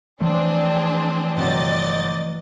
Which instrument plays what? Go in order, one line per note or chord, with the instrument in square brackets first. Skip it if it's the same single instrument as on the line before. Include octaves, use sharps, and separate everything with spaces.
[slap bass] E3 F3 A3 [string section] C4 D4 G#4
[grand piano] G1 C3 F#3 [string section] D5 D#5 A6